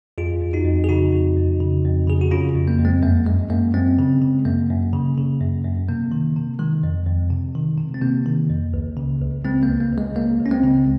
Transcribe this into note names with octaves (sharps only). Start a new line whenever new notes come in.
F2 F4 G#4
F2
D#4 F#4
F2
G#4
C#3 D#4 F#4
F2
F2
C#3
F2
C#3 G#4
F#4
C#3 C#4 F4
F2
A#3
F2
G#3 C4
F#2 A#3
F#2 G#3
F#2 A#3
F#2 G#3 C4
C#3
C#3
F#2 A#3
F#2
C#3
C#3
F#2
F#2
C3 A#3
D#3
C3
D#3 G#3
F2
F2
C3
D#3
C3
C4
C3 A#3
D#3
F2
C#2
C#3
C#2
C#3 G#3 C4
A#3
C#2
A#3
C#2
G#3
C#2 A#3
C#2
C#4
G#3 C4
C#3